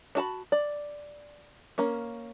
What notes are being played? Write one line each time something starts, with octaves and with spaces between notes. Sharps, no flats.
D4 F#4 A5 B5
D5
A#3 C#4